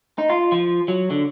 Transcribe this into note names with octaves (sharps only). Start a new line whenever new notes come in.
D#4
F4
F3
F#3
D3